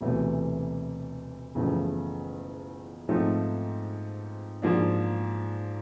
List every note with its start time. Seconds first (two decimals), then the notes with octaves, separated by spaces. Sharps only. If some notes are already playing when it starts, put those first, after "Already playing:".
0.01 E1 D2 C3 E3 A3
1.55 F#1 E2 C#3 F3 A3
3.09 G#2 F3 A3 C4 D#4
4.62 G#2 F3 A#3 D4